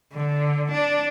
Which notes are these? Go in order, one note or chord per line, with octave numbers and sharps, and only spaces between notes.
D3
D4